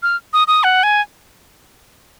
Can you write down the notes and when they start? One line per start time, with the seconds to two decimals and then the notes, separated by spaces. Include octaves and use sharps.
0.03 F6
0.33 D#6
0.48 D#6
0.64 F#5
0.83 G#5